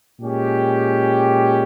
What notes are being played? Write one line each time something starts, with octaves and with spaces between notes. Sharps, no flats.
A#2 G#3 C#4 G4